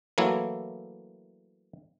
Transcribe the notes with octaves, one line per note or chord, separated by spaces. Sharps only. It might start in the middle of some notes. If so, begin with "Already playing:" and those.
E3 F#3 A3 A#3 E4